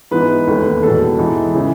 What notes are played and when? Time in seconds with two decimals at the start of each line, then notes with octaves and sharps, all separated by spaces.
0.11 G#2 E3 B3 D#4 B4
0.46 E1 D#2 D#3 A3
0.83 E1 E2 B2 A4
1.18 G#2 E3 B3 D#4
1.55 C#3 E3